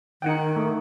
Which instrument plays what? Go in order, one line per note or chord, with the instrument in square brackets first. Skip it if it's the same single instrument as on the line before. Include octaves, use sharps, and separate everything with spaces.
[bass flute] D#3 [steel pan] D#4 F#5 G5
[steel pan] A3